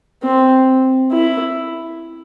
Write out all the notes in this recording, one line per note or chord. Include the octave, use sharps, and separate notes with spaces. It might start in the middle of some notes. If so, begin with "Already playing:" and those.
C4
E4